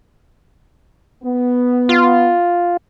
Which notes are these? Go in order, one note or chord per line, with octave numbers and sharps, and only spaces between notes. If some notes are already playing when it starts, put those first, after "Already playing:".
B3
F4